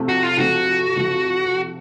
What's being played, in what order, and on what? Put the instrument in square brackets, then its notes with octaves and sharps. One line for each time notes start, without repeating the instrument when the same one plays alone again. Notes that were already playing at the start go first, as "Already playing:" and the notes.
Already playing: [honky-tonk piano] C3 F3 A3 C4
[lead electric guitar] F#4
F4
[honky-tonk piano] C3 F3 A3 C4 [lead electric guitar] F#4
[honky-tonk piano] C3 F3 A3 C4